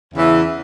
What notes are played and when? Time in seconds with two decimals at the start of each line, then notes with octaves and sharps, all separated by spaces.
0.13 E2 C#3 E3